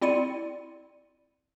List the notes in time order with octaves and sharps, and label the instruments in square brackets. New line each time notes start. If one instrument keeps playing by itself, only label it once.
[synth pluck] C4 E4 D5 C6 C#7 D#7